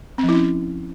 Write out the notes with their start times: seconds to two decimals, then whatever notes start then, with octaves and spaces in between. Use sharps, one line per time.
0.18 C4
0.23 F3
0.29 E4
0.34 C#4